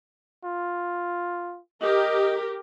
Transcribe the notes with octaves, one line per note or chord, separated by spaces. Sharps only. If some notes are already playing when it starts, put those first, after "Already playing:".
F4
G4 A#4 D#5